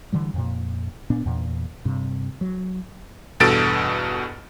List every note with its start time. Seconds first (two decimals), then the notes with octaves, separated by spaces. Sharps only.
0.12 D3 E3 G3
0.34 F2 A#2
1.10 A#2 B3 D4
1.26 E2 A#2
1.85 G2 C3
2.41 F#3
3.40 E2 G2 B2 A4 A6 D7